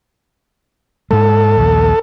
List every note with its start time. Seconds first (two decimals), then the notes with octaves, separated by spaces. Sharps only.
1.11 G#2 G#3 A4
1.57 A#1 D#2